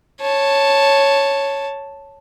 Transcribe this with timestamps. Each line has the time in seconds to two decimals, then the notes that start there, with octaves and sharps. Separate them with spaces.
0.21 C#5 A5